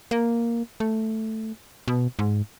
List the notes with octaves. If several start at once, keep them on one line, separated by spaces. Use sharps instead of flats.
A#3
A3
B2
G#2